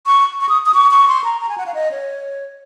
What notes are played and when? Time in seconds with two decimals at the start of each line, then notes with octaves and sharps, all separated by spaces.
0.06 C#6
0.41 C#6
0.49 D#6
0.66 D#6
0.74 C#6
0.91 C#6
1.08 C6
1.24 A#5
1.41 A#5
1.49 G#5
1.58 F#5
1.66 F5
1.74 D#5
1.91 C#5